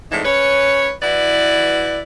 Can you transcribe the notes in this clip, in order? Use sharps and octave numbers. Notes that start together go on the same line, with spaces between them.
F2 A2 D3 E3 G#3 D#4
C#4 B4 C#5
E3 E4 F#4 B4 D5